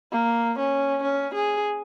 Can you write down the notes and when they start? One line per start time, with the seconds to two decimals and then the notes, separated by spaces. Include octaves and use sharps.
0.12 A#3
0.58 C#4
1.03 C#4
1.34 G#4